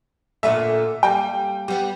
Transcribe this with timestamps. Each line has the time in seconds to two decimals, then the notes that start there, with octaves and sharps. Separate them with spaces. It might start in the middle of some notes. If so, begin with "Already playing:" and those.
0.43 A#2 D3 A3 E5
1.03 G3 A#3 G5
1.68 G3 B3